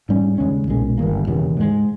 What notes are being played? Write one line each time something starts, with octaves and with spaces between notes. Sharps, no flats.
G#2 G3 C#4
D#2 C#3 G#3 C#4
B1 A#2 G#3 C#4
G1 G2 D#3 A#3
E1 D#2 C#3 E3
G#2 E3 G#3